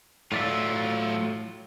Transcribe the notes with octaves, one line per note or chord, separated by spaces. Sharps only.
A2 F#3 F4 D5 E5